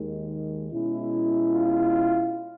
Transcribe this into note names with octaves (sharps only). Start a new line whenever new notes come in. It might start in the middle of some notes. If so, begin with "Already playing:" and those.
Already playing: D#2 D#3 G#3
B2 G#3 C#4 E4
F4